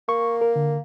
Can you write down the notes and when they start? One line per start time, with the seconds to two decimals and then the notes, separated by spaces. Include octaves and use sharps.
0.09 A#3 C#6
0.41 A#4
0.56 D3